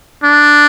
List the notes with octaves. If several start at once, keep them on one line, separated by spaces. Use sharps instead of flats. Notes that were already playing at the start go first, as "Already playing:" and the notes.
D4